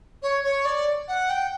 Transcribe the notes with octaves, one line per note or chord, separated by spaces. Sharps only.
C#5
C#5
D5
F#5
G5